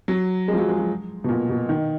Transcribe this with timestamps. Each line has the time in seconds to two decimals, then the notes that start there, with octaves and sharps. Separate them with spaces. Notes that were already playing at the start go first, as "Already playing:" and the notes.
0.08 F#3
0.48 G#3
0.53 F3
0.58 F#3
0.69 G#3
0.79 F#3
1.24 B2
1.29 A#2
1.49 B2
1.69 D#3